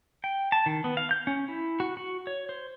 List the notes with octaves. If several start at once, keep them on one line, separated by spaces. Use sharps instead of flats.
G5
A5
D#3
B3
F5
G6
C#4
E4
F#4
F#4
C#5
C5